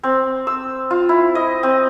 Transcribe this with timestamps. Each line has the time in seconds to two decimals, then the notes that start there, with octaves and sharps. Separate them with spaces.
0.03 C4
0.47 E6
0.91 F4
1.09 E4
1.35 D#5
1.63 C4